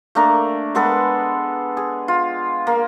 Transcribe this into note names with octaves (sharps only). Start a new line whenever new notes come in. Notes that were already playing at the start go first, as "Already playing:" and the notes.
A3 A#3 D4 A#4
G#3 B3 A4 B4
G#4
F4
A#3